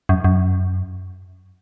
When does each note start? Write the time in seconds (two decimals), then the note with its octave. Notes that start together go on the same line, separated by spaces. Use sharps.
0.09 F#2
0.24 F#2